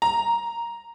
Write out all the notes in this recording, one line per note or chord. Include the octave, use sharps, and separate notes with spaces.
A#5